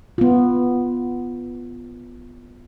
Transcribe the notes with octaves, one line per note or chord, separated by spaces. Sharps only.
B3 F4